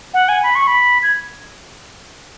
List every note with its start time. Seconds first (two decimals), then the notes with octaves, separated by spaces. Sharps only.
0.14 F#5
0.29 G#5
0.43 B5
0.55 C#6
0.67 B5
1.03 G#6